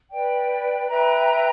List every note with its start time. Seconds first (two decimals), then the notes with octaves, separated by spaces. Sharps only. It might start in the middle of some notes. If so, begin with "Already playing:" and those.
0.10 B4 D5 G5
0.88 B4 E5 G5 A#5